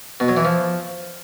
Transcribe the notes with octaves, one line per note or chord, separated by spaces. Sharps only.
B2
F#3
E3
F3